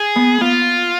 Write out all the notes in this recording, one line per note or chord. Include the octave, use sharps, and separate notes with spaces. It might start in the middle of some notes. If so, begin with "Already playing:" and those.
Already playing: G#4
B3
B3 F4